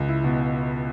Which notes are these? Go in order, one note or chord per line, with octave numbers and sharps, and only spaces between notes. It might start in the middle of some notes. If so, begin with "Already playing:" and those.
Already playing: C#2
E4
B2